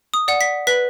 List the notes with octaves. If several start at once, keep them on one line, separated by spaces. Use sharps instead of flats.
D#6
D5 F#5
B6
B4 B6